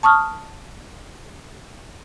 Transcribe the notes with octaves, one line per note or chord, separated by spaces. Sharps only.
A5 C#6 D#6 F6